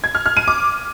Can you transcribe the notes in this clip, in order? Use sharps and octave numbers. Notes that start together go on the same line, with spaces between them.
G#6
F6
F6
D#7
D6